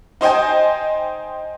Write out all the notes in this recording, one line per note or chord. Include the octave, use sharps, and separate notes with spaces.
D#4 C5 D#5 G5 G#5